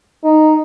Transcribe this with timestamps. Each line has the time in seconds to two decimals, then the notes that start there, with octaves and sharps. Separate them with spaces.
0.24 D#4